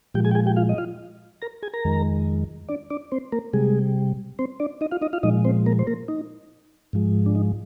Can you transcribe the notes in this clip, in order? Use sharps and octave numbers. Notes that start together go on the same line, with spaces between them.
A#2 F3 G#3 G4 G5
G#4 G#5
G5
G#4 G#5
G4 G5
F4 F5
D#5
F4 F5
A#4 A#5
G#4 G#5
A#4 A#5
F2 D#3 G#3
D4 D5
D4 D5
C4 C5
A#3 A#4
C3 G3 G#3 G#4
C4 C5
D4 D5
D#4 D#5
F4 F5
D#4 D#5
F4 F5
A#2 F3 G#3 D#4 D#5
C4 C5
A#3 A#4
C5
A#3 A#4
D#4
G#2 F3 G#3
D4
D#4